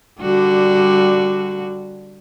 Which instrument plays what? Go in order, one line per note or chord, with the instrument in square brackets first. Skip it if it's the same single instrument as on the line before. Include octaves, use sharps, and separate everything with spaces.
[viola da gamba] D3 G3 F#4